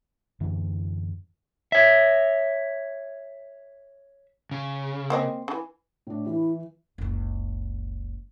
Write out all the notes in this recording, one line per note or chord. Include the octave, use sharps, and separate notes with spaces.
F#2 D3 E3
C#5 E5
C#3
A#3 C4 D#5
C#3 E3
A2 D4
E3 E4
F#1 C#2